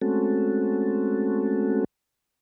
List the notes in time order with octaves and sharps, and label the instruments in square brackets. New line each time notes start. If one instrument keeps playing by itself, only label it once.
[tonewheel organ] G#3 A3 C4 C#4 F#4 A4